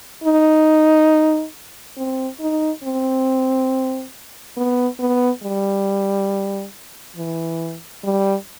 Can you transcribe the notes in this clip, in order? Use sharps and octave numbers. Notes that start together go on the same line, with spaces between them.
D#4
C4
D#4
C4
B3
B3
G3
E3
G3